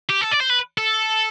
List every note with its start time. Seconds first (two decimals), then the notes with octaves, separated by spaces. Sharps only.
0.09 G4
0.21 A4
0.31 D5
0.40 C5
0.49 B4
0.78 A4